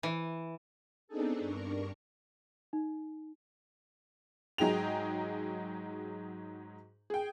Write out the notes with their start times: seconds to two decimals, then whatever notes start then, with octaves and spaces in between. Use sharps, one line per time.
0.03 E3
1.08 B3 C4 D4 D#4 G#4 A4
1.39 G2 D4 A#4 C#6
2.73 D#4
4.58 G#2 F#3 D#4 G#4 G5 F7
7.10 G#4 G5